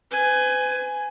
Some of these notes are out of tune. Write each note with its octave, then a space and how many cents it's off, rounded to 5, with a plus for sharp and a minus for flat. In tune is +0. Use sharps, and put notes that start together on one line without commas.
B4 +40 G#5 +0